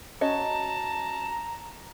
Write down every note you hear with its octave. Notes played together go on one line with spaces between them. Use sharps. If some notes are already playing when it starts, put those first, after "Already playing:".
C#4 F#4 D#5 A5 A#5